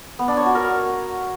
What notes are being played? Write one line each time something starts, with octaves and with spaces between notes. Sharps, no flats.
B3
D4
C#5
F#4
A#4